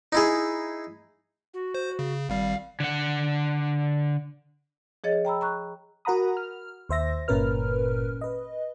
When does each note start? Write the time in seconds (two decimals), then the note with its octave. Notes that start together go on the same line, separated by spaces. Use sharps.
0.12 D#4 E4 G#4
1.54 F#4
1.74 C5
1.99 C#3
2.29 G#1 G3 F5
2.80 D3 F#5
5.04 F3 G#4 C#5 D#5 A6
5.25 G5 A#5 B5 E6
5.41 A#5 C#6 F#6
6.05 F#4 A#4 F#5 A#5 B5 D#6
6.37 F6
6.89 D#2 C5 E5 A#6
7.28 G1 A#2 C#4 A#4 B4 F6
8.21 B4 D#5